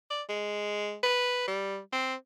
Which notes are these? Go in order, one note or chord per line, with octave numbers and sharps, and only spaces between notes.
D5
G#3
B4
G3
C4